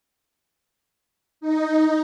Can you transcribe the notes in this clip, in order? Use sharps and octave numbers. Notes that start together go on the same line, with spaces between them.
D#4